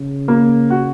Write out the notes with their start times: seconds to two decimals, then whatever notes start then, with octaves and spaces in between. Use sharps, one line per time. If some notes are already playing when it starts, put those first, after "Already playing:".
Already playing: C#3
0.28 A#3
0.70 F#4